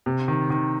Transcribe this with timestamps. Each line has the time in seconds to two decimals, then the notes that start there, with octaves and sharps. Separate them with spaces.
0.06 C3
0.28 D#3
0.50 D#3